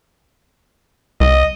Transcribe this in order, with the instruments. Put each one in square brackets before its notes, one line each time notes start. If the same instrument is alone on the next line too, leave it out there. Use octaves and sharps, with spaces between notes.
[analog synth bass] C2 [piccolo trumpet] D#5